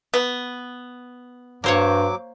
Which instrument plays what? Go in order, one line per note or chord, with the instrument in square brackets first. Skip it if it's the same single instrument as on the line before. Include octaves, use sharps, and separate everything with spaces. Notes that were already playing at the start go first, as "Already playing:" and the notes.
[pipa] B3
[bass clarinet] G2 [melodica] F#3 D6 [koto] A#3 C5 C#5